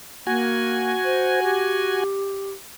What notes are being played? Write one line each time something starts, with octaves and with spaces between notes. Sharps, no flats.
A#3 F#4 G#5
C5
G4